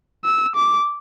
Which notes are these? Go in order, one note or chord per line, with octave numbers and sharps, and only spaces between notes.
E6
D6